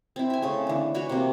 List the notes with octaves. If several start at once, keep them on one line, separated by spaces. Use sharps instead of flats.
C4 E4
E5 G#5
C#3 A3
D3 E3
E4 F#4 B4 C#5
C3 A#3